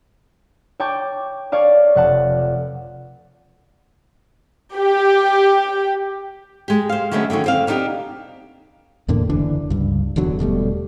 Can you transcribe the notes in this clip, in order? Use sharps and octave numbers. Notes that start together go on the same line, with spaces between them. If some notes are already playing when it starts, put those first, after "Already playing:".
C#5 G5 A5 C#6 D6 G6
C#5 D5 F5 A5
F1 F#5 A5
G4
G#3 G4
C5 F5
D3 F#3 G#3 A3 B3 C#4
D3 D#3 F#3 C#4
D3 C4 F5
B3 D4 D#4 F4 G4
E2 A2 D3 A#3
F#1 D3 E3 D4
C#2 G2
D#1 E2 D3 F#3
E1 B2 G3 A3